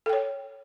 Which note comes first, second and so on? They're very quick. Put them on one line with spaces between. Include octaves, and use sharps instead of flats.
A4 G5 C#5